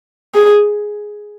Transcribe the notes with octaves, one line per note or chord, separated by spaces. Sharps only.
G#4